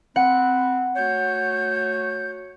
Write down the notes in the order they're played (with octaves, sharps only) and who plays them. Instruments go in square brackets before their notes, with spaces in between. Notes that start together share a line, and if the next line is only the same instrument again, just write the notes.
[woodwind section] C4 [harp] F#5 [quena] B5
[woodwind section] A3 F#4 C#5 [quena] G6